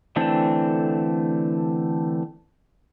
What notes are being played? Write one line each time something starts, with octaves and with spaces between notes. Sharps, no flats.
D3 E3 A3 C4 D4